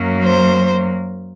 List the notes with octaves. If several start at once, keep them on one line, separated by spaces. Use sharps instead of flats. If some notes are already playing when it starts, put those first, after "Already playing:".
Already playing: F#2 F#3 A#3
C5